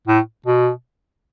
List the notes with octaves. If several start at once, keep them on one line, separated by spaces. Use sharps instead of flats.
A2
B2